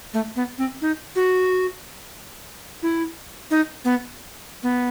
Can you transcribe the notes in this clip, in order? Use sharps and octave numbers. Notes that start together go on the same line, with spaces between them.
A3
B3
C4
D#4
F#4
E4
D#4
B3
B3